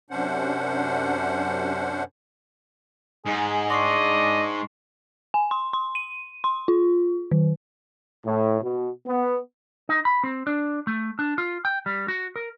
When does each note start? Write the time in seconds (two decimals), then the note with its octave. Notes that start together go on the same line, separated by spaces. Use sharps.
0.10 F#2 C3 C#4 D4 C5 F#5
3.25 G#2 G#4
3.70 D4 D#5 C6 C#6 C7
5.34 G#5
5.51 C6
5.73 C6
5.95 D#7
6.44 C6
6.68 F4
7.32 D#3
8.25 A2
8.62 B2
9.07 B3
9.89 D#4
10.05 B5
10.24 C4
10.47 D4
10.87 A3
11.19 D4
11.38 F4
11.65 G5
11.86 G3
12.08 F#4
12.36 A#4